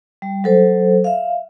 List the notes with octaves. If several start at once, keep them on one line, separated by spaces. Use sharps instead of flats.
G3
F#3 A4 C5
E5 F5